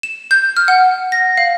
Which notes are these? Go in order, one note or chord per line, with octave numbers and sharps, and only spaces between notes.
E7
G6
F6
F#5
A#6
F5